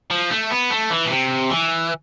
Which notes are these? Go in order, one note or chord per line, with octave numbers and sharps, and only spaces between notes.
F3
A3
B3
A3
E3
B2
C3
E3